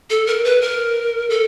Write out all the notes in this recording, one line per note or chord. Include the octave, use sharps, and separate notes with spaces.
A4
A#4
B4
A#4
A4